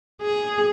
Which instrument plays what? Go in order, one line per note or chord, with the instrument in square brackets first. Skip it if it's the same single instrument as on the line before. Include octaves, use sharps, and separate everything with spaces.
[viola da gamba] G#4